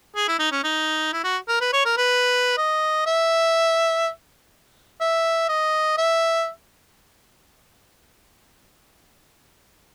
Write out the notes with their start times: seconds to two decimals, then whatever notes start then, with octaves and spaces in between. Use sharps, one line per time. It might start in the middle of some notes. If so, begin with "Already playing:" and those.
0.16 G#4
0.28 E4
0.39 D#4
0.52 C#4
0.64 D#4
1.13 E4
1.24 F#4
1.48 A#4
1.61 B4
1.73 C#5
1.86 A#4
1.97 B4
2.58 D#5
3.07 E5
5.01 E5
5.49 D#5
5.98 E5